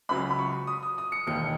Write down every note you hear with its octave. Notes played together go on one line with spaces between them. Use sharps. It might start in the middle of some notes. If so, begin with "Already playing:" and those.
C#2 C#3 F#3 B5
B5
C#6
D#6
D#6
D#6
C#7
E1 D#2 D#3 C#7